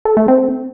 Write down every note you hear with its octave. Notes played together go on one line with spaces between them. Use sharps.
A4
A3
C4